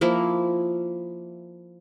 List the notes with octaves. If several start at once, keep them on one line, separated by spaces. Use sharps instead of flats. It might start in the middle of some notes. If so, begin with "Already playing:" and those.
F3 A#3 E4